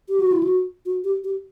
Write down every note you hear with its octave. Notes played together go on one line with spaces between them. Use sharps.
G4
F#4
E4
F#4
F#4
G4
G4